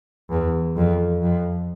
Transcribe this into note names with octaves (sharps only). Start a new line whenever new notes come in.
E2
F2
F2